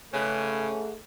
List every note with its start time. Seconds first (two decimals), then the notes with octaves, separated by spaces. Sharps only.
0.14 G#2 C#3 A3 C#4 G#4 B4